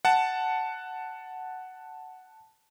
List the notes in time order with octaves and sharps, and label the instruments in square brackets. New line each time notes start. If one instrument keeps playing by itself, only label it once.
[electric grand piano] F#5 A5